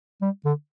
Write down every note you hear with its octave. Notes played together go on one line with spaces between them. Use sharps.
G3
D3